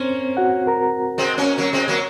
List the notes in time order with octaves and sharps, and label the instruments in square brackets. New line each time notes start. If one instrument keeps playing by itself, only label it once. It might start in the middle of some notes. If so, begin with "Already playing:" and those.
Already playing: [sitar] A#3 C#4 [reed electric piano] C4 C5
[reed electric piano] F#4 F#5
A#4 A#5
[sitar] G#3 C4
A#3 C#4
F#3 A#3
G#3 C4
F#3 A#3